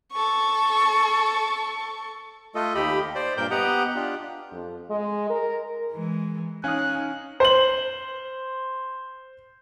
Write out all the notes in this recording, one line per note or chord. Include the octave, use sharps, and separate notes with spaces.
A4 C#6
A3 F4 A4 D#5
D#2 G4 D#5 B5
C5 D5
G2 A#2 A#4 G5 G6
B3 G4 D#5 F#5 A#5
D4 F4 G4
F2
G#3
A#4
E3 G#3
C#4 D#4 F5 G#5 D#6 F#6
C5 F#7